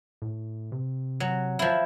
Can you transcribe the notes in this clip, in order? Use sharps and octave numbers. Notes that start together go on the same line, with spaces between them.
A2
C3
F#3
F3 E4